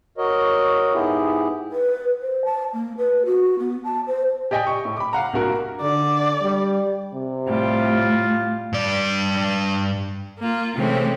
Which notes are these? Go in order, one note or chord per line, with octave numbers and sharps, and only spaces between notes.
F#4 A#4 C#5 D#5
G#2 B3 E4 G4 G#4
B4
C5
A5
A#3
B4
F#4
B3
A5
C5
G4 D5 D#5 G5 G#5
C#6
A2
B5 D6
F5 F#5 A#5
C2 G2 A#3 F#4 A#4
D3 D5
G3
C3
A2 G3 F4
G2 D5
A#3 F4
C3 E3 G#3 A3 C4 C#4